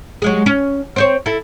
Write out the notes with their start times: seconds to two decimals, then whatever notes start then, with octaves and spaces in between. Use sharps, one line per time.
0.22 F#3 G#3 G#4
0.46 C#4
0.96 C4 C5 C#5
1.26 E4 A4